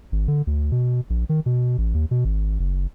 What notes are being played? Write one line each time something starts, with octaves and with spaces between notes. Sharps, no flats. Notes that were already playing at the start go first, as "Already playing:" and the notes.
G#1
D3
D2
B2
A#1
D#3
B2
A1
D#2
B2
G#1
F#1